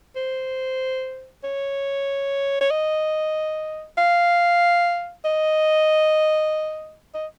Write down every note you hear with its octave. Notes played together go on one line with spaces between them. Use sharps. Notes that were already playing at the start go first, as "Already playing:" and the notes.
C5
C#5
C#5
D#5
F5
D#5
D#5